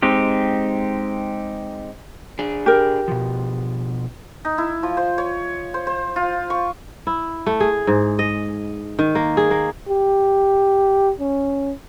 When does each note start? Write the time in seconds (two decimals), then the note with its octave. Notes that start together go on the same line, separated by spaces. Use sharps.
0.03 G#3 C4 D#4 G4
2.39 D4 G#4
2.66 G4 A#4
3.08 B2 F3
4.45 D#4
4.58 E4
4.83 F3
4.97 C5
5.18 C#5
5.74 C5
5.87 C5
6.16 F4
6.50 C#6
7.07 E4
7.46 A3
7.60 G#4
7.87 G#2
8.19 D#5
8.99 D#3
9.15 A#3
9.37 G#4
9.51 A#3
9.89 G4
11.20 C#4